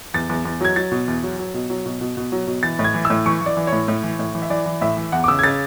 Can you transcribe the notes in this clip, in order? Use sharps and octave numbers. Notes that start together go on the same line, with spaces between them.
E2 A6
E2
E2
F#3 G#6
F#3 A6
B2
E2
F#3
F#3
B2
F#3
B2
B2
B2
F#3
B2
E3 A6
A2
G#6
E3
E6
A2
E3 C#6
E3
D5
E3
C#5
A2
A2
E3
A2
E3
E5
E3 D5
E3
A2 E5
E3
E2 F#5
D6
C#3 E6
G#6
C#3 A6